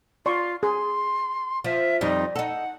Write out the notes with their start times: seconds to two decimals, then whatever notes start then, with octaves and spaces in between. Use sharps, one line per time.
0.26 F4 D5 C6 C#6
0.63 G#4 C6
1.64 F3 E5
2.01 F2 G3 D#4
2.36 D#4 A4 F#5